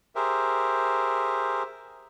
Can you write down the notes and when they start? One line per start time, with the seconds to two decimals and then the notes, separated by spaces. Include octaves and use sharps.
0.16 G4 G#4 A#4 C5 E5